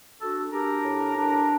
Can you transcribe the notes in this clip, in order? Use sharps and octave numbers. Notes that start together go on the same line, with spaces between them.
D4 F#4 A4
D4 G4 A#4
A2
D4